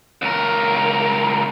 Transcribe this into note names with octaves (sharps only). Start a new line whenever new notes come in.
C#2 A#4